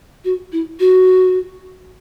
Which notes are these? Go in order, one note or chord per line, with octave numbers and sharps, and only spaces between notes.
F#4
E4
F#4